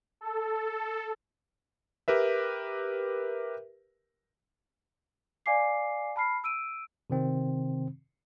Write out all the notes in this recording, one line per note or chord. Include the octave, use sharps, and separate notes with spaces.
A4
G4 A#4 B4 E5
D5 F5 G#5 D6 C7
A5 B5 F6 C7
E6 D7 D#7
C3 D#3 C4